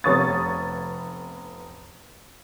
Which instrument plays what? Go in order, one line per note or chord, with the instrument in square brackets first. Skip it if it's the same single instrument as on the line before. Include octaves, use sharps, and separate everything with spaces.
[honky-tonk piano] F1 B3 C#5 C#6 D#6 A6